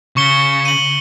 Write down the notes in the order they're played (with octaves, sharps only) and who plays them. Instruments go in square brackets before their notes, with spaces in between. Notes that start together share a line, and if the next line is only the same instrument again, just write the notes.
[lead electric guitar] C#3 [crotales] C#6 C#7 G7
[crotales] D#7 F#7